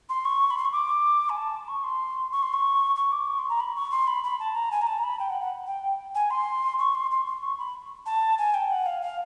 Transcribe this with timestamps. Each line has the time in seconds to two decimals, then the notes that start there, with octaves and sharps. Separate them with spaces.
0.09 C6
0.25 C#6
0.50 B5
0.57 C6
0.65 C#6
0.72 D6
1.29 G#5
1.36 A5
1.68 C#6
1.84 C6
2.32 C#6
2.42 C6
2.53 C#6
2.95 C#6
3.12 D6
3.27 C#6
3.38 C6
3.49 A#5
3.60 B5
3.75 C#6
3.91 C6
4.07 B5
4.23 B5
4.39 A5
4.55 A#5
4.71 G#5
4.81 A#5
4.87 A5
4.98 A#5
5.03 B5
5.19 G5
5.30 F#5
5.40 F#5
5.66 G5
6.15 G#5
6.30 C6
6.79 C#6
6.95 C6
7.11 C6
7.26 C6
7.42 C#6
7.58 B5
8.06 A5
8.38 G#5
8.54 G5
8.70 F#5
8.86 F5
9.02 F5